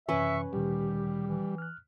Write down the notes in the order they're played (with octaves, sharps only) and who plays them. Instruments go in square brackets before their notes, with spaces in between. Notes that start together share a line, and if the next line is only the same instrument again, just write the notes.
[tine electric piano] F#2 C3 E3 [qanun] C#4 B4 [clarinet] E5 [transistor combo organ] C#6
[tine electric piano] D2 A#2 D#3 [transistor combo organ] G3 [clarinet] G4
[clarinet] E3
[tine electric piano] F6 F#6